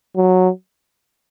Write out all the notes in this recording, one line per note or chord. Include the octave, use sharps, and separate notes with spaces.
F#3